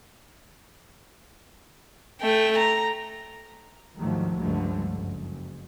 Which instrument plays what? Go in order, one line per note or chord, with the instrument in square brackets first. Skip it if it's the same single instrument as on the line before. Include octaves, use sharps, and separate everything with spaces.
[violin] A3 G5
A#5
[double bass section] D2 G#2 D#3 F3 F#3 A3
C#2 G2 D3 F3 A3
F#1